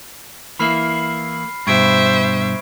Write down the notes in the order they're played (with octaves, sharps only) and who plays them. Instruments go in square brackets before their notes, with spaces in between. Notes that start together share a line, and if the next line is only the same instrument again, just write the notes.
[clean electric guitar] E3 A#3 E4 [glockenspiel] B5 F6 C7
[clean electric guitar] G2 B2 [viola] C5 E5 [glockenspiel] C#6 G#6 D7